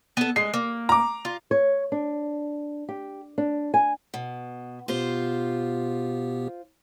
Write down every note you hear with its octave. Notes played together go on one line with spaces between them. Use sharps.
B3 A4
G#3 C7
A#3
A#5 D6
F4
C#5
D4
G4
D4
G#5
B2
B2 B3 F4 G4 C5